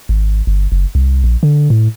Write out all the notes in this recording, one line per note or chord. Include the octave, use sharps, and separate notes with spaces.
G#1
G1
F#1
C2
A#1
D3
A2